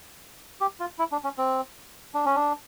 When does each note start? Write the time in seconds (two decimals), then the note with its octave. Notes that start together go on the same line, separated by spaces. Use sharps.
0.61 G4
0.80 F4
0.99 E4
1.12 D4
1.24 C#4
1.38 C4
2.14 D4
2.25 C#4
2.36 D4